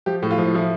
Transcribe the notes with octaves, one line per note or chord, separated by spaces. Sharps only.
F3 G4
A2
F4
F3
F3 E4